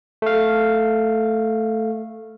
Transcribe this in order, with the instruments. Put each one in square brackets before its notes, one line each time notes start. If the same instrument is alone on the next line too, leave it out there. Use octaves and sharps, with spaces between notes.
[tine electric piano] A3 F5